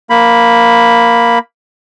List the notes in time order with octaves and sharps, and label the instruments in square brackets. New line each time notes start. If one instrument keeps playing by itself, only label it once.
[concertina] A#3 B5